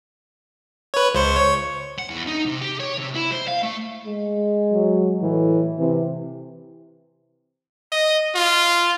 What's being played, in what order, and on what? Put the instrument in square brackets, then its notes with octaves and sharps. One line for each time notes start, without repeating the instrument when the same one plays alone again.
[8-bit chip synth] B4 C#5
C#2 C5 C#6
C#5 C#6
[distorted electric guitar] F#5
E2
D#4
C3
G4
C#5
C3
E4
C5
F5
A3
[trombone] G#3
[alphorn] F#3
[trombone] A2 [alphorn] E3
[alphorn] C3 [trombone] E3
[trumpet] D#5
F4